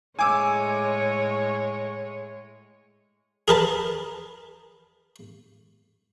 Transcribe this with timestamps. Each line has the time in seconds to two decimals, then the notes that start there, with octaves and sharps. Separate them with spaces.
0.19 A2 G#3 C#5 G#5 D6 E6
3.48 G#4 A#4 B4 A5